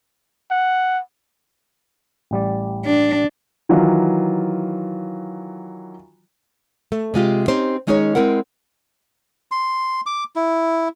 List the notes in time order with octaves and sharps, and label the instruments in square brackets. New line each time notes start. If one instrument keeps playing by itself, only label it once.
[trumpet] F#5
[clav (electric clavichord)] A1 G3 D5
[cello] D4
[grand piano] D#3 E3 F#3 F4
[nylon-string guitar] A3
C3 G#3 F4 G4
C4 C#4 D#4 G4 C5
D#3 G#3 C#4 D#4 G#4 C#5
G#3 C4 E4 A#4 F#5
[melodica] C6
D6
E4